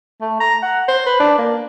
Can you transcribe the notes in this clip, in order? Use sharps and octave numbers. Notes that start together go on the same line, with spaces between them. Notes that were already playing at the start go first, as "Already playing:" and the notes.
A3
A#5
F#5
C5
B4
D4
A#3